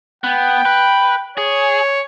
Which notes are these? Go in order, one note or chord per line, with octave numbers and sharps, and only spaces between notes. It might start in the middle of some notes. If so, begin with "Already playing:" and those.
B3 G5
B4
G#4 C#5